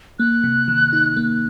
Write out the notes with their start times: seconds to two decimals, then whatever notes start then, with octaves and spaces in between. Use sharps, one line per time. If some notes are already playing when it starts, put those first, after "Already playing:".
0.19 A#3 F#6
0.44 C3
0.68 D#3
0.93 D#4
1.17 A#3